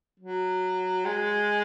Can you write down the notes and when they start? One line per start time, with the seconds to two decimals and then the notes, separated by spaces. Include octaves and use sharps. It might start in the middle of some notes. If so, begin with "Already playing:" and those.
0.20 F#3
1.06 G#3